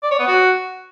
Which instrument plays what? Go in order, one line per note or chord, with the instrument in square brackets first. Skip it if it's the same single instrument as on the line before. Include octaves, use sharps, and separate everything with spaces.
[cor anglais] D5
C#5
B3
F#4